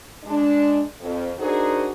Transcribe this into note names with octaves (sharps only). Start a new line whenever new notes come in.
G#3 D4
F2
D4 D#4 F#4 G#4 A#4 C5